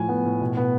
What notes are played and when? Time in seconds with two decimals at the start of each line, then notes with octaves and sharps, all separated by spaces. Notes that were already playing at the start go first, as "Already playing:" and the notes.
Already playing: A2 F3 G#5
0.09 B3
0.25 A2
0.41 B2
0.57 B3